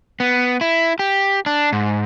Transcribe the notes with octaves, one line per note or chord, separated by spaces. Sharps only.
B3
E4
G4
D4
G#2